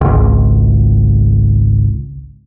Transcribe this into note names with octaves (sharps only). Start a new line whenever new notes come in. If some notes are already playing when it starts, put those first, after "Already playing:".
G#1 C#2